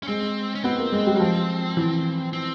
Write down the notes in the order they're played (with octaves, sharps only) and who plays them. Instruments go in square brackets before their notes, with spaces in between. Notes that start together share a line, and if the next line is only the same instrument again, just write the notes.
[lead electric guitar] C#4
[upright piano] G#3 [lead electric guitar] C4
[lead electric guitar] C#4
[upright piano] B3 [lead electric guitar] C4
[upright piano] A#3
G#3
G3
F#3
F3
E3
[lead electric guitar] C4